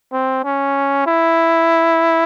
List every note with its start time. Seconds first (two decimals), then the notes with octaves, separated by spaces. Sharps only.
0.12 C4
0.44 C#4
1.06 E4